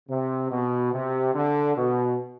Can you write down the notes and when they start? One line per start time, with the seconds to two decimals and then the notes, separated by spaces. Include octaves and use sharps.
0.09 C3
0.50 B2
0.92 C3
1.34 D3
1.76 B2